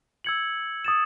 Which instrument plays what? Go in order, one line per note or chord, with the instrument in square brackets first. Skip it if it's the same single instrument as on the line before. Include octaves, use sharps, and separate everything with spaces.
[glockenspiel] E6 G#6 C#7 F#7
D#6 A6 E7